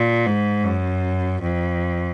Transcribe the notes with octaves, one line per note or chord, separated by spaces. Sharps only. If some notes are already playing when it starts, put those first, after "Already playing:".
Already playing: A#2
G#2
F#2
F2